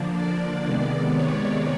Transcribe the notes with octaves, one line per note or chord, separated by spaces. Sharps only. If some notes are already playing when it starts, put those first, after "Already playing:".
Already playing: D3 F3 A#3 D4
D5
C3 D#3 G#3 B3 D5
C#5